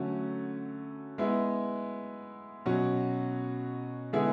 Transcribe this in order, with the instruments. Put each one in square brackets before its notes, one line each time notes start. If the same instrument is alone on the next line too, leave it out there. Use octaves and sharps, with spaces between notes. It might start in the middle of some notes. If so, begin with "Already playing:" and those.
Already playing: [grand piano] D3 F#3 A3 C#4
G#3 B3 E4
B2 F#3 C#4 F#4
D3 G#3 B3 E4 G#4